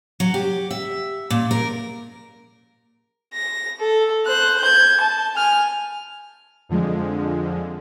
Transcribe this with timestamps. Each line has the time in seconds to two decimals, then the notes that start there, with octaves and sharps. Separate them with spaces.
0.20 F#3
0.34 G4
0.71 E5
1.30 A#2
1.51 A#4
3.34 A#6
3.80 A4
4.27 C5 F#6
4.61 G6 G#6
5.01 A5
5.37 G#5 F6
6.69 F2 D3 F3 G#3